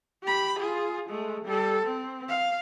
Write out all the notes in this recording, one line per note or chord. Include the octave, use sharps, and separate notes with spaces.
G4 B5
F4 G#4
G#3 A3
G3 A4
C4
F5